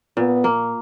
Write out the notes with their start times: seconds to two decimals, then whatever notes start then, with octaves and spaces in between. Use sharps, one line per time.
0.17 A#2 B3
0.44 A#3